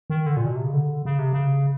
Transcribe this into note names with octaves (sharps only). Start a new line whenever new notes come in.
D#3
D3
A#2
B2
C3
C#3
D3
C#3
C3
C#3